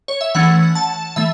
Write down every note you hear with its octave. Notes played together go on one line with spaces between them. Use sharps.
C#5
E5
E3 A3 C#4 F#5
A5
E3 A3 E5